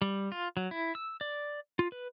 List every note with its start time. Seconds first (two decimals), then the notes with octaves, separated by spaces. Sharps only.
0.02 G3
0.32 F4
0.57 F#3
0.71 E4
0.95 E6
1.21 D5
1.79 F4
1.92 B4